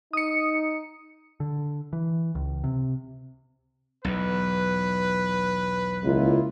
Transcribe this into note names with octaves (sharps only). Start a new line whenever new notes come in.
D#4 D#6 C#7
D3
E3
C#2
C3
B1 E2 B4
C#2 A#3 E4 F4